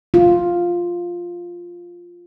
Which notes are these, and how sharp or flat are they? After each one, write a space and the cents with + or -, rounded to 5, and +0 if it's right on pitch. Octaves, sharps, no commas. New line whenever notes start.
F4 +0